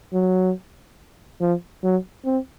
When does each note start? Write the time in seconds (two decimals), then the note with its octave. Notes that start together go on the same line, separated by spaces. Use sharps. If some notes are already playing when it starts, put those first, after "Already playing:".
0.13 F#3
1.41 F3
1.84 F#3
2.25 C4